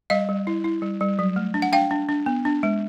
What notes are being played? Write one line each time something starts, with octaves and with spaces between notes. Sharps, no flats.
G3 D#5 F5
G3
E4
E4
G3
G3
F#3
A3
D4
F#5
D4 F5 G5
D4
D4
B3
D4
G#3